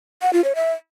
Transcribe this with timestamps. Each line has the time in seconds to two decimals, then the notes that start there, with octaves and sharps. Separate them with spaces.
0.22 F#5
0.33 F4
0.44 C#5
0.55 E5